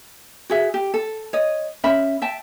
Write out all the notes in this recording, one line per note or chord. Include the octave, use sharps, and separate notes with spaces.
F#4 G#4 E5
G4
A4
C#5 D#5
C#4 E5 B5
E5 G5 A5